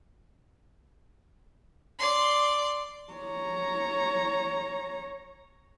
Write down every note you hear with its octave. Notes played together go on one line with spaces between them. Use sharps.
D5 C6
C#5 A#5